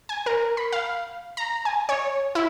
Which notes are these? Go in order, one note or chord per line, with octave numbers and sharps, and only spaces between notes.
G#5
A#4
B5
F5
A#5
G#5
C#5
E4